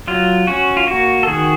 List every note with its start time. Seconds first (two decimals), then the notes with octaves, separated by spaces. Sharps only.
0.07 F#3 F4
0.47 C#4 F#4
0.77 F4
0.87 A#3 F#4
1.23 A4
1.27 D#3 F#4 G#4